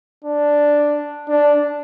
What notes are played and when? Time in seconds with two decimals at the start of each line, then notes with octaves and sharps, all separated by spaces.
0.24 D4
1.28 D4